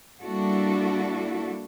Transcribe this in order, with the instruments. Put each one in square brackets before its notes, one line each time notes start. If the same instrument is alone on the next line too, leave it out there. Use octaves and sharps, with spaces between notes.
[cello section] G3 A#3 D4 E4 F#4 A4